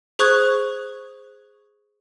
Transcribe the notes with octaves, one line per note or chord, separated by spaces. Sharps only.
G#4 C5 C#6 D#6 F#6 G#6